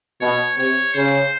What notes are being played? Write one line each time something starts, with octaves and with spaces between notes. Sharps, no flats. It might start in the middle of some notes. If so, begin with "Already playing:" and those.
B2 C#5
C3 C#5
C#3 C5